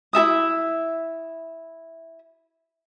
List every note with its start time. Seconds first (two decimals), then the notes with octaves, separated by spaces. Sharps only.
0.13 E4 A4 E5 D#6